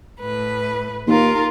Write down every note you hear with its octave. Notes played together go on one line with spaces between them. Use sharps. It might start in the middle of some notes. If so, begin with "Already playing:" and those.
A2 B4
D#2 F4 A#4